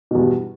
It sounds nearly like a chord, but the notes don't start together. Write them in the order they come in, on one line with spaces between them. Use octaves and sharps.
B2 E2 G2